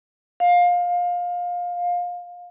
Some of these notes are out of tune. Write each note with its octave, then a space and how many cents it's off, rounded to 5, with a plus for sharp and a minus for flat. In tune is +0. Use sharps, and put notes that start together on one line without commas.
F5 +20